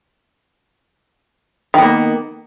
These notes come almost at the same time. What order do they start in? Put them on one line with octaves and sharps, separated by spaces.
D#3 B3 A#3